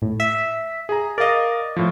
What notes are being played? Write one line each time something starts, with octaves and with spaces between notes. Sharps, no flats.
A2
E5
G#4 G#5 A#5
A#4 D5 D#5 F5
A2 F3